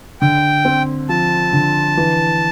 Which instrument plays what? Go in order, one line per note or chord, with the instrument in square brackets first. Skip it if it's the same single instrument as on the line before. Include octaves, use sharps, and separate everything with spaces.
[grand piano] D3 [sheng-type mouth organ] G5
[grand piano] C4
[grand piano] F3 [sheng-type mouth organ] A5
[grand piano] D3
E3